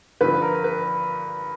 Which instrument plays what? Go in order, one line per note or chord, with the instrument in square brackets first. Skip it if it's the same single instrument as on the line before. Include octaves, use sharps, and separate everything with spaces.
[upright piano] G2 D3 F3 B4
A#4
B4